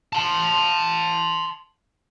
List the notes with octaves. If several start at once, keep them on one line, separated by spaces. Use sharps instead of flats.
A5 C6